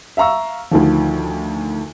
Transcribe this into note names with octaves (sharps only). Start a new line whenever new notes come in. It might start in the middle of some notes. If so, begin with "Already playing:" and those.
E5 F5 A#5 C#6 E6
D2 D#3 F3